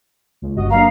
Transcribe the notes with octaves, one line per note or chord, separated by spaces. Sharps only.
C#2
G1 F#4 D#5
D3 F#3 A#3 F5 A#5